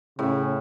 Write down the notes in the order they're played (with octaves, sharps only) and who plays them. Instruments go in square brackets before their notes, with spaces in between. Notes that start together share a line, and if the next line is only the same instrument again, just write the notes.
[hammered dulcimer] A2 [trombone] C#3